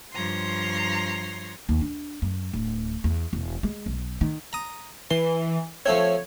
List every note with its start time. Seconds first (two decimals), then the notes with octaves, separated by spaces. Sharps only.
0.13 G2 F3 C#5 A#5 C6
1.69 D#2
1.81 D4
2.22 F#2
2.53 D1
3.04 E2
3.33 E1
3.63 G#3
3.86 B1
4.21 D#3
4.53 A#5 D#6
5.11 E3 C6
5.86 F3 A3 C4 C#5